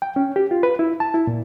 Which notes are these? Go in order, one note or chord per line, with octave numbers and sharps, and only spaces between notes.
G5
C#4
G4
F4
B4
E4
A5
E4
A#2